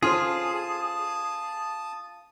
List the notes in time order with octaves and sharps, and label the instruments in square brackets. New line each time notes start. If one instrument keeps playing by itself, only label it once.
[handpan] C#4 A4 C5 [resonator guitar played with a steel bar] F4 [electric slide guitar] G#4 [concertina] A5 D#6